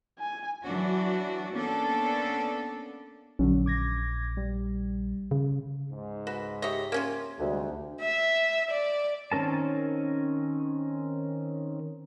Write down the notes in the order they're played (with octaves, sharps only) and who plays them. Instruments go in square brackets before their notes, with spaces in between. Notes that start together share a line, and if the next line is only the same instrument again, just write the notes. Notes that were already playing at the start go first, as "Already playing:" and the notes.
[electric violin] G#5
[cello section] E3 F#3 D4 F#4
A#3 B3 C#4 D4 A4
[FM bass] A#1 [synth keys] D3 F#3 C#4
[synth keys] D6 G#6 A#6
G3
[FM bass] C#3
[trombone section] C#2 G#2
[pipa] F#4 [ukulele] B4
[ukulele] G4 E5 [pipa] C#5 D#5
[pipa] A#3 C#4 F4
[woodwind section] D2 [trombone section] C3 G3 G#3
[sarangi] E5
D5
[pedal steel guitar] D#3 C4 C#4 A#4 A5